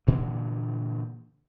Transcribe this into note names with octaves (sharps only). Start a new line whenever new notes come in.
G2 A#2 D3 E3